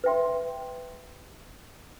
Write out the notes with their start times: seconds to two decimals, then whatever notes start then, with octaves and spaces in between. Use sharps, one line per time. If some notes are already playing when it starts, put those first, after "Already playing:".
0.04 B4 E5 G5 C6